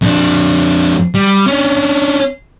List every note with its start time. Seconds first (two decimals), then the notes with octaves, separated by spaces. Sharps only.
0.02 F2 D4
1.15 G3
1.47 C#4 D4